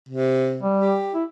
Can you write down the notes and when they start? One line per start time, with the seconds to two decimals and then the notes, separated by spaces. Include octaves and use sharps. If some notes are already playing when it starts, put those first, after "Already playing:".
0.09 C3
0.63 G3
0.77 G4
1.14 E4